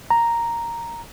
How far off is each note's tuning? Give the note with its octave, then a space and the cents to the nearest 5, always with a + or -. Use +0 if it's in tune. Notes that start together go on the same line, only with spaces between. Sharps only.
A#5 +0